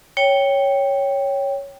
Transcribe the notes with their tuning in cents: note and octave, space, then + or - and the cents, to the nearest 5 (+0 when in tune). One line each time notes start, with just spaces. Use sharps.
C#5 +0 G5 +0